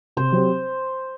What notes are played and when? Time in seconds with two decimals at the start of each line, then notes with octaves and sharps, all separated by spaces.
0.17 C3 C5
0.32 F#3 C4 G4